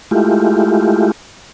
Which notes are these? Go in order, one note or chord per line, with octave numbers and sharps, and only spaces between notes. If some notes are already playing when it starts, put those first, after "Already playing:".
G#3 A3 E4 F4 G4